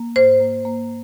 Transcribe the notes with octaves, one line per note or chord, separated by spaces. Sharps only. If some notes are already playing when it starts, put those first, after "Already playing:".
Already playing: A#3
G#2 C5
A#3
A#3